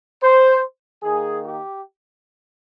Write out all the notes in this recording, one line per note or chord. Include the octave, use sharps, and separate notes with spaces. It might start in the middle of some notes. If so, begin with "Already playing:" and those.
C5
D#3 A#3 G#4
G4